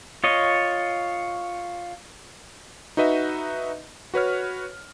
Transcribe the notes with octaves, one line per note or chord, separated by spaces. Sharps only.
F4 C#5 D#5
D#4 F#4 B4 D#5 E5
F#4 B4 C#5 F6